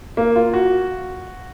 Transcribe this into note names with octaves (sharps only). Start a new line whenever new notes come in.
A#3
F4
F#4